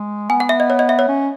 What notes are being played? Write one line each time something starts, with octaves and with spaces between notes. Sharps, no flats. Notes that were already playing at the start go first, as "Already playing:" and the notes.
Already playing: G#3
B3 G#5
F#5
E5
D#5
C#5
D#5
E5
C#5
C#4